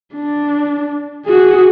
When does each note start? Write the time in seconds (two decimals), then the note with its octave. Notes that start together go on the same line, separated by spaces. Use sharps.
0.15 D4
1.26 F#4 G#4